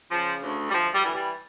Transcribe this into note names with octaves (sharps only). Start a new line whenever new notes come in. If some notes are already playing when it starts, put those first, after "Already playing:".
C#3 F3
D2
G3
D2 F3
G3
E3
G3